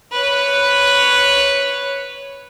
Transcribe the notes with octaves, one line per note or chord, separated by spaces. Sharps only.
B4 C#5